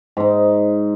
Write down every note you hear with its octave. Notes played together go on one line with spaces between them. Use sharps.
G#2 D#4